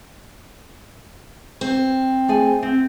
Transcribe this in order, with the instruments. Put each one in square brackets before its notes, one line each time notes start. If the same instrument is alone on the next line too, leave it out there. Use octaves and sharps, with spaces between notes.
[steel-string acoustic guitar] C4
[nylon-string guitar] A3 G#4 G#5
C4